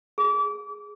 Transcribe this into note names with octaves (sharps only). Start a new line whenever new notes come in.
G#4